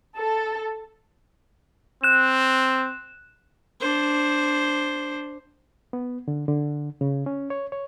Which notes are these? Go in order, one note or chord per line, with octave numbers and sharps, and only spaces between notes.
A4
C4 F#6 E7
D4 C5
B3
D3
D3
C#3
C#4
C#5
C#5